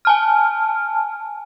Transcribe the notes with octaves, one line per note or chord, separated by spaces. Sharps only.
G#5 A5 F6